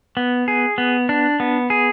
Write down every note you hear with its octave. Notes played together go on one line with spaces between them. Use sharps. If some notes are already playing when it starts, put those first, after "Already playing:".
B3
G#4
B3
D4
B3
G#4